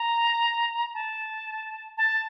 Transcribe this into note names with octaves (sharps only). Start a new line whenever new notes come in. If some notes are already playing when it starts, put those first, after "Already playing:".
Already playing: A#5
A5
A5